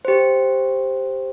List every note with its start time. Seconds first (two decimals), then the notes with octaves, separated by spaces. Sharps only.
0.05 G4 C5